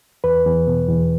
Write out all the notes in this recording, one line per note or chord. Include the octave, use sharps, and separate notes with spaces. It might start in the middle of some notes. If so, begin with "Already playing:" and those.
E2 B4
E2
B2
E2